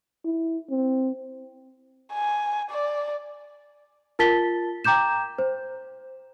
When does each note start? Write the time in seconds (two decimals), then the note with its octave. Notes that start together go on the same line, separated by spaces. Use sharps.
0.25 E4
0.70 C4
2.13 G#5
2.71 D5
4.19 F4 A#4 A5 A6 B6 G7
4.84 G5 A#5 D6 G6 E7
5.39 C5